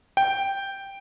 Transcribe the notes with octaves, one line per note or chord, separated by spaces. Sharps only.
G5